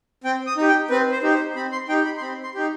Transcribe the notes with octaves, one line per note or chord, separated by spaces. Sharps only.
C4 G5
D#6
D#4 G4
G5
C4 B4
C5
D#4 G4
C5
C4 B5
C6
D#4 G4 G5
B5
C6
C4 B5
C6
D#4 G4